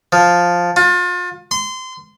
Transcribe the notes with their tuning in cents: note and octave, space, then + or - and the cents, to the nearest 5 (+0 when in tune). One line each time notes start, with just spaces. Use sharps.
F3 +5
F4 +35
C6 -25